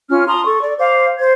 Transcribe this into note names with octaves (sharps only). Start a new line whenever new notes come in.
C#4 F4 F6
A5 A#5 C6 D#6
A4 C#6
D5
C5 F5 D6
C5 G#6